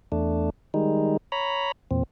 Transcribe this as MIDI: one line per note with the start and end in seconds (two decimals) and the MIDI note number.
0.12 0.50 40
0.12 0.50 57
0.12 0.50 62
0.74 1.17 51
0.74 1.17 55
0.74 1.17 56
0.74 1.17 63
1.32 1.72 73
1.32 1.72 82
1.32 1.72 83
1.91 2.03 40
1.91 2.03 46
1.91 2.03 60